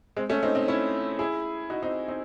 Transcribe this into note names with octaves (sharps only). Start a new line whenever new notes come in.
G#3 C4
A3 C#4
C4 D#4
C4 D#4
C#4 E4
E4 G#4
D#4 F#4
C4 D#4
C4 D#4